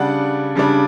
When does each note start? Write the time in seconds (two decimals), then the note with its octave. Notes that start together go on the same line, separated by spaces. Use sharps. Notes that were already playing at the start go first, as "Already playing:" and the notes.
Already playing: C#3 G3 D4 D5 F#5
0.55 C#3 G3 D4